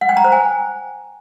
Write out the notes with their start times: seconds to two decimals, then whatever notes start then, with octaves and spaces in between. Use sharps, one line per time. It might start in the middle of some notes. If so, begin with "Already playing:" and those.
0.01 F#5
0.09 G5
0.17 A#5
0.24 C5
0.32 G#5